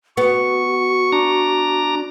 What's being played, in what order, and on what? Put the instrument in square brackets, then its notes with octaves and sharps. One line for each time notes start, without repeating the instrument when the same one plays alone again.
[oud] B3 [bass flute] F#4 [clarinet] C#6
[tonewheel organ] D4 A#5